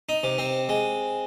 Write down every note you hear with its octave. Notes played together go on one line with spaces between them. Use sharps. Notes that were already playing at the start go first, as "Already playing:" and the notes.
D#4
C3
C4
G#3